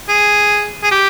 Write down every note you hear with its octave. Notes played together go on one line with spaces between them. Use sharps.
G#4
G#4
G4